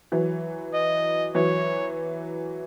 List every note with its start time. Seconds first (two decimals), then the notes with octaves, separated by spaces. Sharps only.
0.12 E3 F#3
0.74 D#5
1.34 E3 F#3 C#5